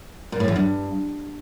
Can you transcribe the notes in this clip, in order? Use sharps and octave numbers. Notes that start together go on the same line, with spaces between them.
A#2
A2
E2
G2